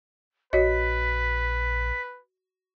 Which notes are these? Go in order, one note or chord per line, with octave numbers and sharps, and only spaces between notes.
A#1 F#4 B4 C#5 D#5 B6